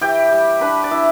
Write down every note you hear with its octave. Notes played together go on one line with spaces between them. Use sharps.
E3 G4 G5
G3
D4 B4 B5
D5
E3 E4 E5